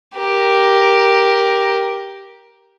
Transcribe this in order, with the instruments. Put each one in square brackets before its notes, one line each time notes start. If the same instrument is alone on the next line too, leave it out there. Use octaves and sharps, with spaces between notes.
[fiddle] G4 A#4